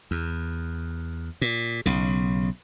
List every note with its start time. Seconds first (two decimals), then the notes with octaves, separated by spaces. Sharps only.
0.11 E2
1.41 A#2
1.86 B1 C#3